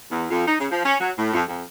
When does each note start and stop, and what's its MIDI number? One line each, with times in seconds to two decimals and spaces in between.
0.11 0.25 40
0.31 0.43 41
0.47 0.54 63
0.59 0.66 49
0.71 0.81 53
0.85 0.95 61
1.00 1.12 54
1.18 1.30 45
1.33 1.42 41
1.48 1.63 41